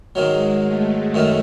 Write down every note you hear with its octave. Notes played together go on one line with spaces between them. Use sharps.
G#2 D#3 F#3 G#3
A3
F#2 D#3 A3